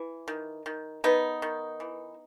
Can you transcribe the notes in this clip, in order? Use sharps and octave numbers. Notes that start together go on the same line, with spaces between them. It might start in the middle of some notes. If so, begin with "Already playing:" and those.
Already playing: E3
D#3
D#3
D#3 B3 D#4
D#3
E3